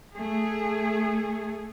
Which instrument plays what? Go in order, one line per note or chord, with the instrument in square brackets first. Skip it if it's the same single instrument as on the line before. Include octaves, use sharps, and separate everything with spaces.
[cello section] A3 G#4